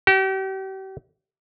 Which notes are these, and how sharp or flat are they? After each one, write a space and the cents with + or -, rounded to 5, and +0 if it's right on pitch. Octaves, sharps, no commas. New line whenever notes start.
G4 -40